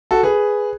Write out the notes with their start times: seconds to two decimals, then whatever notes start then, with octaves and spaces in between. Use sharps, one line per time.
0.11 F#4 A4
0.23 G#4 B4